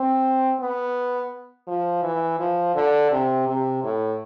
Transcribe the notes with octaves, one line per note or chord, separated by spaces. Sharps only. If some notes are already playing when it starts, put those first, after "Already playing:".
Already playing: C4
B3
F3
E3
F3
D3
C3
C3
A2